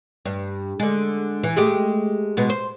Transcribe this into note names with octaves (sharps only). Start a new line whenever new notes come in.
G2
D3 G#3
E3
G#3 A3 G4
B2 G#3 B3
C5